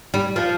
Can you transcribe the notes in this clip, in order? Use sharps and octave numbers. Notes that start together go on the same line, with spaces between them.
G3
F3